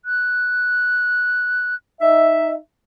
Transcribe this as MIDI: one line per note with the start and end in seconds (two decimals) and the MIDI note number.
0.05 1.75 90
2.01 2.54 63
2.01 2.54 76